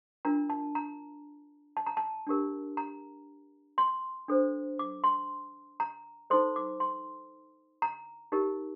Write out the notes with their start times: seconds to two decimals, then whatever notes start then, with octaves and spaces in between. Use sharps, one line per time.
0.25 D4 F4 A#4 A#5
0.50 A5
0.75 A#5
1.77 A5
1.86 A#5
1.97 A5
2.27 D4 G4 A#4
2.77 A#5
3.78 C6
4.28 D4 A4 C5
4.79 D6
5.04 C6
5.80 A#5
6.30 D#4 A4 C5 C6
6.56 D6
6.80 C6
7.82 A#5
8.32 D#4 G4 A#4